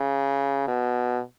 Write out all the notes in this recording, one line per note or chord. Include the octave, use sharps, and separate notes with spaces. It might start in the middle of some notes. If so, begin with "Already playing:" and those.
Already playing: C#3
B2